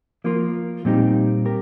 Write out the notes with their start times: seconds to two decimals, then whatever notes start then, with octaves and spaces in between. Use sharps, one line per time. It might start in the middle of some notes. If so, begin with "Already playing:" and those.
0.24 F3 A#3 F4 A#4
0.85 A#2 G3 C4 D#4 G4
1.45 G4 A#4